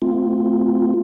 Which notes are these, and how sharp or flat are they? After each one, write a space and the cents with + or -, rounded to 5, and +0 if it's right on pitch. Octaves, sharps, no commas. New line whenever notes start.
A3 -10 C4 -30 F4 +0